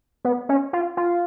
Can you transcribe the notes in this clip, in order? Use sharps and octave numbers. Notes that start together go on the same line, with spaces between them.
B3
C#4
F4
F4